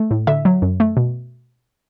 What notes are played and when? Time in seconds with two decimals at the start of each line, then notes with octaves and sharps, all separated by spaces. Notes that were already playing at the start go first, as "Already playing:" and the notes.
Already playing: A3
0.11 A2
0.27 D3 E5
0.45 F#3
0.62 F#2
0.80 A3
0.97 B2